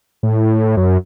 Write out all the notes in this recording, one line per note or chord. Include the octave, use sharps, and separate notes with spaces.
A2
F#2